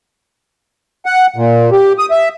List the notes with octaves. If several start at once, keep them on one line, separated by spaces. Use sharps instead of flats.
F#5
A#2
G4
D#6
E5